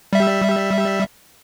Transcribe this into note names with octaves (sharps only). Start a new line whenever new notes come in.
G3 E5